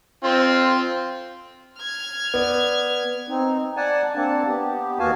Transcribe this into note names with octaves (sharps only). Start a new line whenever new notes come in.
C4 F4
F6 G#6
B3 D5
C4 D#4
D5 F#5 G#5 A5
A#3 C4 D4 F#5 A5
B3 G4
D#2 B3 F#4 F5 G#5 A5